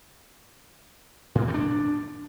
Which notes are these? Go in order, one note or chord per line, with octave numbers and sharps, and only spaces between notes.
A2
A#3
A3
D4